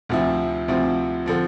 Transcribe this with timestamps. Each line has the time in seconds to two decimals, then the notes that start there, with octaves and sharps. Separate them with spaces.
0.09 D2 C3 F3 C4 E4
0.68 D2 C3 F3 C4 E4
1.26 D3 F3 C4